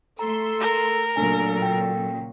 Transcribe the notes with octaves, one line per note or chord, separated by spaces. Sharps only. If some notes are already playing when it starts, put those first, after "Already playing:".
A3 A4 A#5 C6 E6
A#4
A#2 C#3 F#3 A3 D4 A4 G#5
G5 A#6